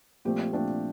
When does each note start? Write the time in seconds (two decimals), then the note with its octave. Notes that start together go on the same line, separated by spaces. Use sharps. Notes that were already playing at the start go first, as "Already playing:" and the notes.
0.25 A#2 F3 A3 C4 G4
0.52 A#2 F3 A3 C4 D4